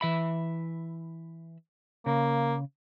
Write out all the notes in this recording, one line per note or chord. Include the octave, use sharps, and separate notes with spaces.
E3 E5 B5
C#3 A#3